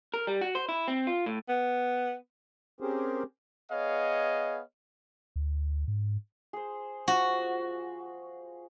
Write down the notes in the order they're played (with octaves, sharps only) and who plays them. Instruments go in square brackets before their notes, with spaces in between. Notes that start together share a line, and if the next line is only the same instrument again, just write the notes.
[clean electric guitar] A#4
G3
F#4
C5
E4
C4
F4
A2
[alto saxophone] B3
[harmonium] C4 C#4 G4 G#4 A#4 C5
[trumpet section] B3 G#4 C#5 D#5 F5
[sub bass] D2
G#2
[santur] G#4 C5
[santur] F3 [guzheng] F#4